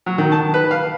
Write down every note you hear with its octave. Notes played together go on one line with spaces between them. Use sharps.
F#3
D#3
A5
B4
F5